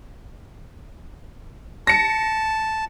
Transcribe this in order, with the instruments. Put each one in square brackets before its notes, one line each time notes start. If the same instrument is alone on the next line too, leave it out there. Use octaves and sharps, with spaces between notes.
[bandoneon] A5 [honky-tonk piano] A#6 C#7